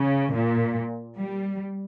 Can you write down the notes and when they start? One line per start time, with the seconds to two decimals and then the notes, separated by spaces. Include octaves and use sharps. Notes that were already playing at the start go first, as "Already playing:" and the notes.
Already playing: C#3
0.34 A#2
1.17 G3